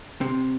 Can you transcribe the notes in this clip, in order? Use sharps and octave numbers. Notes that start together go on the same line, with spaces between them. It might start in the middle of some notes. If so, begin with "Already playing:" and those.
C3